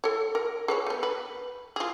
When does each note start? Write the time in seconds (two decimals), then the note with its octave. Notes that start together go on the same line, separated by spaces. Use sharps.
0.04 A4 C#5
0.35 A#4
0.68 G#4 B4 C#5
0.86 A3 B3
1.03 B4
1.76 F4 G#4